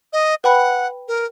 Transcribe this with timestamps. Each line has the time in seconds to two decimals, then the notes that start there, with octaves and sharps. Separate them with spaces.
0.13 D#5
0.44 B4 F#5 G5 B5
1.08 A#4